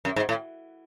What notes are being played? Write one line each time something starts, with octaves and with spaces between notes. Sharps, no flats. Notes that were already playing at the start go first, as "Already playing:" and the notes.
F#2
G#2
A2